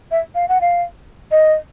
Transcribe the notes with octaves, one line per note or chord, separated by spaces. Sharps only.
E5
F5
F#5
F5
D#5